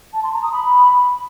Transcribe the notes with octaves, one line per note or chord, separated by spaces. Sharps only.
A5
C6
A#5
D#6
B5